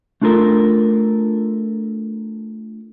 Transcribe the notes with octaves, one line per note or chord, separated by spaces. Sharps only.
A3 D4 F4 A4 A#4